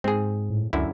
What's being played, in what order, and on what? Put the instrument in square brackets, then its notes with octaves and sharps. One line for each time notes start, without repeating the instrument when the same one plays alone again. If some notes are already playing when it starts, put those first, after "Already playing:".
[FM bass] G#2 [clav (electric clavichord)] C4 G#4
[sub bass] A2
[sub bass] C#2 [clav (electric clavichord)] F#2 D3 E4